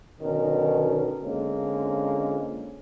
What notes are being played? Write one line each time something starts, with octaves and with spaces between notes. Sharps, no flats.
B1 B2 D3 D#3 C#4 A#4
D3 G#3 A#3 C4 C#4 F4